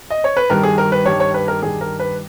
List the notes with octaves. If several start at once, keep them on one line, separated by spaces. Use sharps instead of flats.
D#5
C#5
B4
G2 D#3 G3 A#4
G#4
A#4
B4
G2 D#3 G3 C#5
C#5
B4
A#4
G2 D#3 G3 G#4
A#4
B4